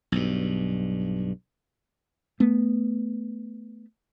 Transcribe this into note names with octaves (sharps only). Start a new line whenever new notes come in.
B1 G2
A3 B3